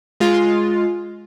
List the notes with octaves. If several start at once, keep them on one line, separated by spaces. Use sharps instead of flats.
G#3 F4